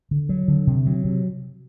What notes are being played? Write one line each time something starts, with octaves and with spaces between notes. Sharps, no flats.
D3
F#3
D3
C3
F#3
C3